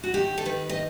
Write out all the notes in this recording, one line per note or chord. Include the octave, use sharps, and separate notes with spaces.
F#4
D#3 G4
A4
D#3 B4
D#5